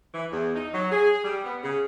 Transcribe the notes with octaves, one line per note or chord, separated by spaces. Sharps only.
E3
E2
D#4
F#3
G#4
G3
B3
C#3